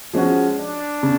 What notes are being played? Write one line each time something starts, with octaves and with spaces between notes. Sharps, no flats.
F3 G#3 C#4 F#4
D4
C#3